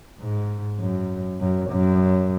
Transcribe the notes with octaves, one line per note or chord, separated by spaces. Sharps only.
G#2
F#2
F#2
F#2